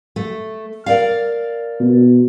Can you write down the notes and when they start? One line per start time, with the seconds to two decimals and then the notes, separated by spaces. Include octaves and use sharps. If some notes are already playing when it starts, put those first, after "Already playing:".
0.16 A3
0.86 A#4 D5 F5
1.80 B2